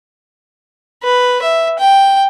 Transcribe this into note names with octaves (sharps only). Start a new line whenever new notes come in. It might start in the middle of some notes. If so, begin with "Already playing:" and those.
B4
E5
G5